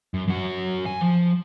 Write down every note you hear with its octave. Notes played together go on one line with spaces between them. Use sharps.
F#2
F#2 F#4
G#5
F3